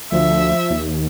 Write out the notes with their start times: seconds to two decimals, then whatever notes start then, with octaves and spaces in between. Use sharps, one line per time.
0.12 D2 F3 E5
0.70 D#2